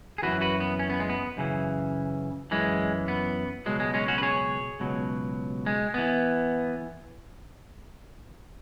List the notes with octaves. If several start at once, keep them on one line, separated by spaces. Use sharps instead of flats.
G#4
F#2 C#3 E3 F#4 B4
F#4 B4
B3
C#4
B3
G#3
B3
F#2 C#3 E3
F#2 E3 G#3
B3
C#2 B2 F#3 G#3
G#3
G#3 C#4
C#4 F#4
B4
G#4 C#5
C#2 B2 F#3
G#3
E3 B3